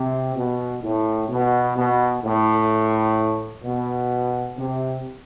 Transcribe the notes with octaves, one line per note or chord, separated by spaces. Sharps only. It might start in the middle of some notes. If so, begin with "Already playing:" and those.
Already playing: C3
B2
A2
B2
B2
A2
B2
C3